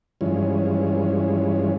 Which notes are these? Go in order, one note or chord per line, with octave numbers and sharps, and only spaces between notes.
G2 E3 F3 G#3 C#4